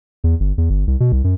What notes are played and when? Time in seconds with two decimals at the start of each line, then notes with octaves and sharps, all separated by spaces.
0.24 E2
0.40 G1
0.58 E2
0.70 G1
0.87 C2
1.00 B2
1.12 C2
1.24 F#2